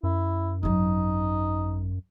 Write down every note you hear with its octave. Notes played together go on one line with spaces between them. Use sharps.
F#2 E4
G#1 F#3 D#4